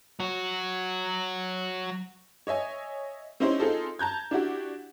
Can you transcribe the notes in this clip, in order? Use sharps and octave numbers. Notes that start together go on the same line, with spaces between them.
F#3 F#4
C#5 D#5 E5 G#5
C4 C#4 D#4 E4 G4 C5
C4 D#4 F4 G#4 A4
A5 A#5 G6 G#6
D4 E4 F#4 G4